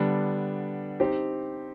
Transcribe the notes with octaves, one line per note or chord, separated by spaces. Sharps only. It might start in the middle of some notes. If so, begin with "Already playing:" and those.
Already playing: D3 G3 B3 D4
C4 D#4 G4 C5